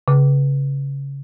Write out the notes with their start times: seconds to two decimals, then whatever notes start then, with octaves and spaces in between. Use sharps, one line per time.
0.08 C#3